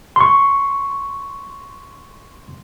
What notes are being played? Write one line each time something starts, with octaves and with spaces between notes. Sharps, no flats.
C6 C#6